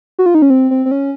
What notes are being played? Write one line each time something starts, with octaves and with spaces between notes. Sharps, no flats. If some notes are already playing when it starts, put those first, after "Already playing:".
F#4
F4
D#4
C#4
C4
C4
C4
C#4